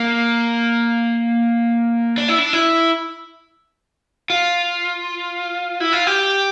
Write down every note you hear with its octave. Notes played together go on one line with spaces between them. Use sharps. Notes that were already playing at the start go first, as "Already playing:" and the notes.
Already playing: A#3
D4
E4
D4
E4
F4
E4
F4
G4